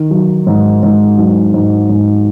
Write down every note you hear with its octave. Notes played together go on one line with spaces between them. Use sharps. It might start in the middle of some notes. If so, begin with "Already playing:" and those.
Already playing: D#3
F#3
G#2
G#2
F#3
G#2
G#2